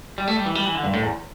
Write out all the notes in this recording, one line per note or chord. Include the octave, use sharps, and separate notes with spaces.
G3
A3
G3
E3
G3
E3
D3
G2
A2
E2